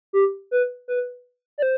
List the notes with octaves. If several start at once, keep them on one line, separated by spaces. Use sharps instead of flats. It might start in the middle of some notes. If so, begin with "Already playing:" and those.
G4
B4
B4
D5
C5